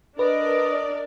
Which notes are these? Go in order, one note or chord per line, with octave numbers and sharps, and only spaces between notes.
D4 A#4 B4 D5 D#5